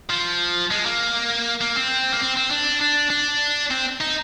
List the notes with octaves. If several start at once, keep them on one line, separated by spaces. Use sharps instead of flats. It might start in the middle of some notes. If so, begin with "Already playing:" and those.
F3
G#3
A#3
A#3
C4
A#3
C4
C4
D4
D4
D4
C4
D#4